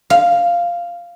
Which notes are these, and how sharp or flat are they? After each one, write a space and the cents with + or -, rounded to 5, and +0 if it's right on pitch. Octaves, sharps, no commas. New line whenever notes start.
F5 -5